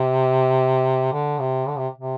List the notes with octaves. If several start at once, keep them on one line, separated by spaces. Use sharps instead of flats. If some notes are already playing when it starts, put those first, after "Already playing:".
Already playing: C3
D3
C3
D3
C3
C3